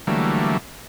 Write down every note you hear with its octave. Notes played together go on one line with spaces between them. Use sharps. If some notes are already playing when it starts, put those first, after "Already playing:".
D3 E3 F#3 G3 A3 A#3